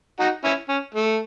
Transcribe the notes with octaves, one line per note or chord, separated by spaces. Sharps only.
D#4 F#4
C#4 E4
C#4
A3